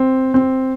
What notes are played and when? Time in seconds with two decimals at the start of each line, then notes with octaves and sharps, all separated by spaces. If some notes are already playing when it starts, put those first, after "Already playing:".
Already playing: C4
0.34 C4